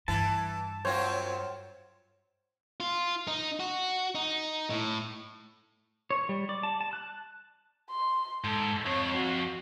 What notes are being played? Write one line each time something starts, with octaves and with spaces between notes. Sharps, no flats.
G2 E3 A5
F#2 C4 F4 C5 C#5
F4
D#4
F#4
D#4
A2
C#5
G3
D5
A5
A5
F#6
C6
G#2 A4
F2 C#5
F#4